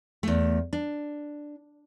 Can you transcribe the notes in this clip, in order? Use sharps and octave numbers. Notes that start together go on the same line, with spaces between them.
E2 A3
D4